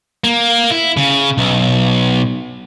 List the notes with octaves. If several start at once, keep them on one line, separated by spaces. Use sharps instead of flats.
A#3
E4
C#3
B1